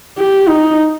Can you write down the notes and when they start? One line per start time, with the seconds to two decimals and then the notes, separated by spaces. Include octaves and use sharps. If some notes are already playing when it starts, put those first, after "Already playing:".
0.18 G4
0.48 D#4